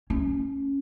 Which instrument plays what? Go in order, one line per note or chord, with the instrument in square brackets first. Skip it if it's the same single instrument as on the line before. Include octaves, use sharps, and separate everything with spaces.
[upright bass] C#4